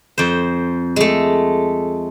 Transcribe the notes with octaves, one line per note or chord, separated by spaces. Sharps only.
F2 C5
G#3 A3